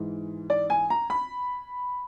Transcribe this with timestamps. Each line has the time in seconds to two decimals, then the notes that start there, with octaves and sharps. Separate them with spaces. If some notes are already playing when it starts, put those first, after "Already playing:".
Already playing: G#2 E3
0.50 D5
0.70 G#5
0.90 A#5
1.10 B5